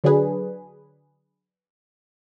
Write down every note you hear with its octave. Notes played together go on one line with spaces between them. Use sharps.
D3 F#3 D4 G#4 B4